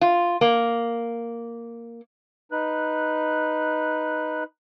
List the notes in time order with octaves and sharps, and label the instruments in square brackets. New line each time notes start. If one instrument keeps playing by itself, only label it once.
[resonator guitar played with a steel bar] F4
A#3
[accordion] D#4 B4 F#6